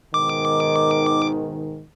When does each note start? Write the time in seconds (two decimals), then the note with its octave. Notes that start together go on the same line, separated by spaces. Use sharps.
0.14 G#2 B2 D#3 D6